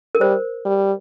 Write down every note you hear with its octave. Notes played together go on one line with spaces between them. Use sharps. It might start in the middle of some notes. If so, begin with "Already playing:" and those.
A#4
G3 C5
G3